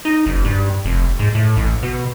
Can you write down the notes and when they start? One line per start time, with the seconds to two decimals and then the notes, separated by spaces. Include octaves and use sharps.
0.05 D#4
0.26 F#1
0.45 G2
0.85 F1
1.19 G#2
1.35 A2
1.57 A1
1.83 B2